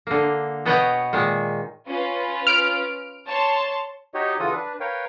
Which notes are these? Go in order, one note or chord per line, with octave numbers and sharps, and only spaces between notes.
D3 A#3
B2 B3 C#5 D#5 F#5 G5
A#2 D#3 G#3
C#4 F4 B4
F6 D7
C#5 A5 C6
D#4 F#4 G4 C#5 D#5
C#3 E3 F4 F#4 A4 D#6
D4 B4
A#4 B4 C#5 F5 G5